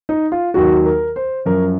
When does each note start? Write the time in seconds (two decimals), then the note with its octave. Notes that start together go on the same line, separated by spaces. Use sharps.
0.09 D#4
0.32 F4
0.54 D#2 D#3 F#3 F#4
0.86 A#4
1.16 C5
1.45 F#2 F3 A#4